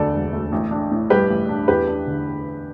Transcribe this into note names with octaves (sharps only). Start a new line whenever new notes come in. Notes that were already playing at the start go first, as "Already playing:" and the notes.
Already playing: E1 D2 D3 A4 D5
E1
A3
A1
D4
A2
G3 G4 B4
A1
D4
E2 G4 B4
D4
D3